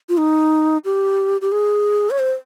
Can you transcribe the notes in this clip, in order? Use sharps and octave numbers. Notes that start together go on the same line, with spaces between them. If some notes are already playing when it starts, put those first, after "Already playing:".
F4
D#4
G4
G4
G#4
C#5
C5